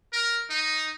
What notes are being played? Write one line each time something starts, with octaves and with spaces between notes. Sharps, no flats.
A#4
D#4